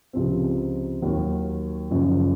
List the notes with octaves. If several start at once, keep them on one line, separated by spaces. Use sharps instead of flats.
C#2 C3 F3 C4
D#2 D#3 F#3
F#1 F#2 F3